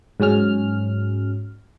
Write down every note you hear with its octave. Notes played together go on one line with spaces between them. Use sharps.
G#2 F#3 C#4 F6